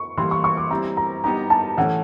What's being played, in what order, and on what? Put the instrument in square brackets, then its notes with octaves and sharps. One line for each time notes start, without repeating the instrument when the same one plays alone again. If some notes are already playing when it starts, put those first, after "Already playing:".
Already playing: [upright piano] C#6
[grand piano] E3 G3 A#3 [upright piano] C6
[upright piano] C#6
C#6
D6
[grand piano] G3 C4 E4 [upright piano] A#5
[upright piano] A#5
[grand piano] G3 B3 D#4 G4 [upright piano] A#5
[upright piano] A5
[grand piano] A2 E3 A3 C#4 [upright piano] F#5